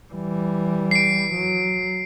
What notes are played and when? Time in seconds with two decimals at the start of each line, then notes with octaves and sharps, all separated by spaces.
0.13 E3 G3
0.91 C7 D7
1.34 F#3